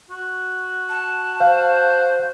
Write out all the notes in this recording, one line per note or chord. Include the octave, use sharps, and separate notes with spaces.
F#4
A5
C5 F5